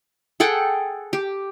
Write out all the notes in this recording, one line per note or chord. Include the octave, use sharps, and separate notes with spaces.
G#4 A4 F#5 G5
G4